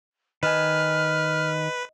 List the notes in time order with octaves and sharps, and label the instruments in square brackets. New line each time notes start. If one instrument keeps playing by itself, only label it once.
[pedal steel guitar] D#3 G#5 [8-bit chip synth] B4 [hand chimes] D#5 [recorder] F6